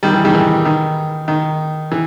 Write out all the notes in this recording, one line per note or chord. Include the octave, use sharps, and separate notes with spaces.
D#3 G3
E3
D#3 G3
E3
D#3
D#3
E3